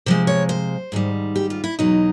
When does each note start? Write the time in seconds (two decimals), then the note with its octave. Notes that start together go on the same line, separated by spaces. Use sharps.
0.06 C3 F3 G#3 C5
0.27 C#5
0.49 C5
0.92 G#2 D#3 G3
1.36 G4
1.50 F4
1.64 E4
1.79 E2 B2 F#3 D#4